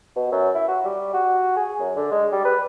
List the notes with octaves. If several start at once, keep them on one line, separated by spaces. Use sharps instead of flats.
B2
F#2
E4
F#4
G3
F#4
G#4
F#2
D3
G#3
G3
B4